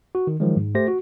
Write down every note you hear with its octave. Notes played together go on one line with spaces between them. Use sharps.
F#4
D#3
D#3 F3 F#3 G#3
G#2
A3 G4 C5 A#6
F#4